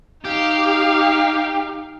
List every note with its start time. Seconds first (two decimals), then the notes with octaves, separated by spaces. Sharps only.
0.24 D#4 G4 F5